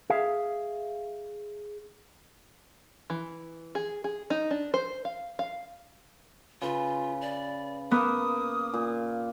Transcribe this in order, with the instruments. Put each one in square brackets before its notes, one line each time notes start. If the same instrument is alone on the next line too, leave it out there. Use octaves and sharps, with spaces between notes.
[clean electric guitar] G#4 E5 F5
[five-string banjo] E3
G#4
G#4
D#4
D4
C5
F5
F5
[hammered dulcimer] C#3 B4 [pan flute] F4
[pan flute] D5
[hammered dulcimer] A#3 [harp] B3 [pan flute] D#6
[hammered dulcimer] A#2